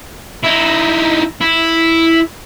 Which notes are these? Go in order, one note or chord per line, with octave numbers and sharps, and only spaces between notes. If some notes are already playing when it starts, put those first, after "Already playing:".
D#4 E4
E4